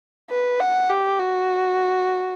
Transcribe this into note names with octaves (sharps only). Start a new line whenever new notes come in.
B4
F#5
G4
F#4